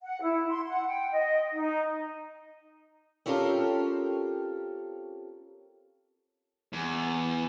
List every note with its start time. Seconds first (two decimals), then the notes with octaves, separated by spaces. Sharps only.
0.01 F#5
0.22 E4
0.49 C6
0.67 F#5
0.87 G5
1.11 D#5
1.53 D#4
3.26 C4 C#4 F4 G4 A4 A#4
6.73 E2